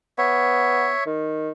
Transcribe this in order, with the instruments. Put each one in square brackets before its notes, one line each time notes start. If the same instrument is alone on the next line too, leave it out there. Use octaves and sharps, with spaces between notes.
[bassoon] B3 [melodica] C#5 E5
[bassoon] D#3